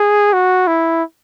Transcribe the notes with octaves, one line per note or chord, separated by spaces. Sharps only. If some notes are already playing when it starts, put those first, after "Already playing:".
Already playing: G#4
F#4
E4